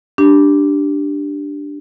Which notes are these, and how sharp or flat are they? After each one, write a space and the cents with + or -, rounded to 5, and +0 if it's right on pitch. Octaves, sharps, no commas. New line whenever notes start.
D4 +0 G4 +0